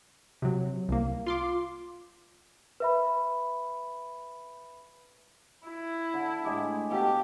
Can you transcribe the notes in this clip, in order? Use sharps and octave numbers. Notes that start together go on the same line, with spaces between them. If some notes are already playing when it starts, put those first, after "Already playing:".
C3 F#3
C2 A#3
F4 C6 D6
B4 E5 B5
E4
D3
A2 G#3 G4
B2 G4 A4 F5